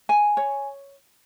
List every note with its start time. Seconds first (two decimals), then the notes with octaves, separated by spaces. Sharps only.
0.09 G#5
0.37 C#5